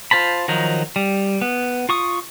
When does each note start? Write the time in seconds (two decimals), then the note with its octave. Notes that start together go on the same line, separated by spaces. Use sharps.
0.11 F4 C5 A5 B5
0.48 D#3 F3 F#3 D#4
0.96 G3
1.41 B3
1.89 F4 C#6 D#6